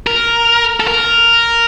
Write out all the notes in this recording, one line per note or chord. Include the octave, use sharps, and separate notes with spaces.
A#4
A4
A#4